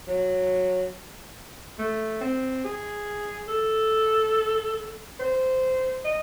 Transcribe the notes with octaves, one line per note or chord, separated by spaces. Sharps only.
F#3
A3
C4
G#4
A4
C5
D#5